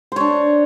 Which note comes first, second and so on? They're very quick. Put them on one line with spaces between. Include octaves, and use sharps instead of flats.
C5 C#5 D4